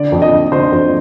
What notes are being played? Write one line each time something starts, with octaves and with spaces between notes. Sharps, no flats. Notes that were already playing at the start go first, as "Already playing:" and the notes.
Already playing: D3 D5
F2
D#5
D3
D3 C5
F2